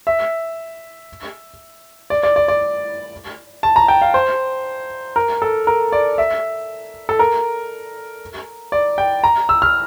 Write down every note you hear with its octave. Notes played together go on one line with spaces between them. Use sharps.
E5
D5
D5
D5
D5
A5
A#5
G5
F5
C5
A#4
A4
A#4
D5
E5
A4
A#4
D5
G5
A#5
E6
F6